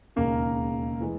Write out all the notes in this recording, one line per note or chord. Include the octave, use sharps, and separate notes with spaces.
E1 D#2 C#3 A#3 A#4
E3 G#3